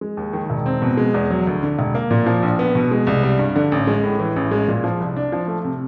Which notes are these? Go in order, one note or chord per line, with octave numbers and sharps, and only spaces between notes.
G#3
D#2
D#3
E1
C4
B2
G#3
E2
F#3
D2
D3
E1
A#3
A#2
F3
A#1
B3
B2
G#3
C2
G3
G2
D3
A1
G#3
A2
E3
A1
G#3
A#2
F3
C2
D4
F3
A3
C3